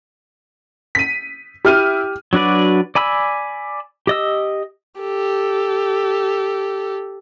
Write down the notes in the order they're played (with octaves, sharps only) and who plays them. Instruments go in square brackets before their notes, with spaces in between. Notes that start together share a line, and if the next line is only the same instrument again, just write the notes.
[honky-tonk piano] B6 D#7
[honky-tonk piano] E4 F6 D#7 [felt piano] G4
[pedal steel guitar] F#3 D4 F#4 B4 D5
D5 G#5 B5 E6
G4 D#5 E6
[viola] G4 A4